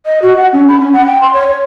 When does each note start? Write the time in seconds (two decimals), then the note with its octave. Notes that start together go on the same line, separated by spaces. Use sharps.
0.06 D#5
0.22 F#4
0.37 F#5
0.53 C#4
0.69 B5
0.80 C#4
0.93 F#5
1.06 G5
1.21 C6
1.33 C#5
1.48 C#5